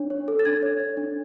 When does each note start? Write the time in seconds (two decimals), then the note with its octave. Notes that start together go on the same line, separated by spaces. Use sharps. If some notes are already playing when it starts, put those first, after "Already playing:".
Already playing: D4 C#5
0.10 C#5
0.28 A4
0.39 A6
0.45 D4 G#6
0.62 C#5
0.80 C#5
0.97 D4